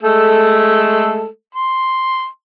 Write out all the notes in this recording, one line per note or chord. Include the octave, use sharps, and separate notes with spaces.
G#3 A3 A4
C6